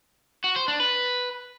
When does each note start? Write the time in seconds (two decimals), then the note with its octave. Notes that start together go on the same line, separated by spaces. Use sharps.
0.44 F#4
0.56 C5
0.68 D4
0.80 B4